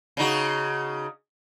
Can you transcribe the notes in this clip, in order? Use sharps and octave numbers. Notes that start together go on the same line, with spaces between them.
C#3 D#4 F#4